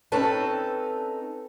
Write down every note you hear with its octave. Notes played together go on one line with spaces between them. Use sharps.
C4 C#4 D#4 A4 B4 A5